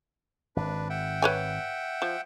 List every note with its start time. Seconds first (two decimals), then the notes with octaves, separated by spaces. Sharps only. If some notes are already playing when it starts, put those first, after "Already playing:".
0.56 G#1 D4 B4
0.90 E5 F#5 G5
1.22 B4 C#5 G#5
2.02 F3